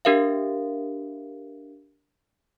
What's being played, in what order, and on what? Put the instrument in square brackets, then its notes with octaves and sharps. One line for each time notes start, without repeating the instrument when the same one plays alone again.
[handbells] D4 G4 A#4 E5 F5